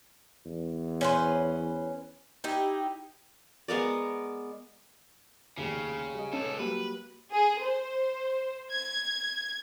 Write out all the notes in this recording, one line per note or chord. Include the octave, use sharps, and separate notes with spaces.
E2
C#4 B4 C5
D#4 E4 G4
G#3 B3 A#4 D5
F1 D#2 C#3
G3 D#5
C#2 C#4 A4
F#3 G3 A#3 B4
G#4
C5
G#6